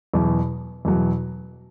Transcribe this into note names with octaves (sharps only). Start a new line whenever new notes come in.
E2 B2 F#3
E2 B2 F#3